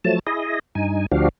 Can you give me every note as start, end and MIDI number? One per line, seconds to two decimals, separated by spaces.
0.04 0.19 53
0.04 0.19 54
0.04 0.19 57
0.04 0.19 81
0.27 0.59 64
0.27 0.59 68
0.27 0.59 75
0.75 1.06 43
0.75 1.06 63
0.75 1.06 80
1.12 1.29 38
1.12 1.29 53
1.12 1.29 62
1.12 1.29 66
1.12 1.29 67
1.12 1.29 77